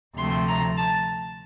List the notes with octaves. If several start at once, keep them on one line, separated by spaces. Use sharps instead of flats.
D2 C3 F3 A3 C6
A#5
A5